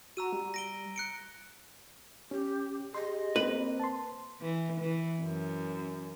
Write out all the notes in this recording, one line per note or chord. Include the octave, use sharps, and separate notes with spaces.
F#4 A#5 E6 D#7
G3
A#6 D7 G7
F#6 C#7 D7
C#4 G4
G4 G#4 D#5 C6
A#3 C4 B4
A5 C6
E3
E3
F#2